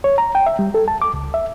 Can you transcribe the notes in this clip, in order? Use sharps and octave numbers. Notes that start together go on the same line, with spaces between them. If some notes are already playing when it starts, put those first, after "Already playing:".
C#5
A#5
G5
E5
G3
A4
A5
D6
C#2
E5